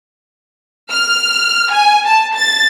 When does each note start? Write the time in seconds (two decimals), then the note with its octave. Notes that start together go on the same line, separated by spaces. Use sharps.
0.91 F6
1.73 G#5
2.07 A5
2.36 A6